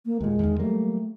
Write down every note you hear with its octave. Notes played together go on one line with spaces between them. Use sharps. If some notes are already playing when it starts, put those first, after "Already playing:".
A#3
D#2 A#2 G#3
E2 D#3
F#3 G3 A3 A#3